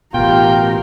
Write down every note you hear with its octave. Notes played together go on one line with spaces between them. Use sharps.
A1 B2 F4 G4 A#4 G5